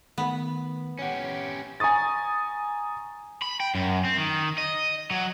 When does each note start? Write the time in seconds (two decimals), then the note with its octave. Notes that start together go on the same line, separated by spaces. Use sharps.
0.18 D#3 A3 B3
0.99 C#4 G4 C#5 F#5
1.80 G#5 A#5 C#6 D#6 A6
3.42 B5
3.60 G5
3.75 F#2
4.05 C4
4.18 D#3
4.58 D#5
5.11 F#3